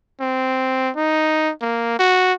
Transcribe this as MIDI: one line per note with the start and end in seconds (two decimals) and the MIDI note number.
0.21 0.90 60
0.96 1.51 63
1.61 1.97 58
1.99 2.33 66